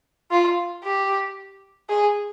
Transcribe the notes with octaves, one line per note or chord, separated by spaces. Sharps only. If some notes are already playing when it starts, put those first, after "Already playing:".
F4
G4
G#4